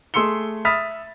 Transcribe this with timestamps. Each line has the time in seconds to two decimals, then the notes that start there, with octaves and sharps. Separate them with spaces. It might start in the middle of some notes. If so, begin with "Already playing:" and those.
0.14 A3 G#4 C6 E6 C#7 G7
0.65 E5 B5 D#6 F6 A6 B6